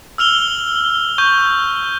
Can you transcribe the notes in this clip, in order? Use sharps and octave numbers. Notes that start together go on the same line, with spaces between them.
E6 F6 F7 G7
C#6 G6